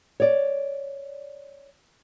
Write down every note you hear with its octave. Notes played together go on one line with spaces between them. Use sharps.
C#5 D5